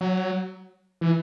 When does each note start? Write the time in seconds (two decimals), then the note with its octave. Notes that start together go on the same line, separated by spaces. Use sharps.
0.01 F#3
1.01 E3